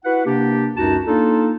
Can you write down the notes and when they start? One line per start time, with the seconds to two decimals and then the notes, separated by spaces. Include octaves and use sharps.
0.05 E4 F#4 B4 F#5
0.26 C3 A#3 D4 G4
0.77 C#2 F#2 D#4 F#4 A5
1.05 A#3 D4 D#4 F4 A4